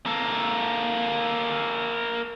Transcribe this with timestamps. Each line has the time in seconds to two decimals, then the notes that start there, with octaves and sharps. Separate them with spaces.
0.06 A#3 A4